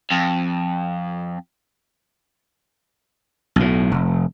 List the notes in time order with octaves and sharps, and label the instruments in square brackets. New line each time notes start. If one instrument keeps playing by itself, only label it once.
[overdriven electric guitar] F2
[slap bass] B1 A2
F1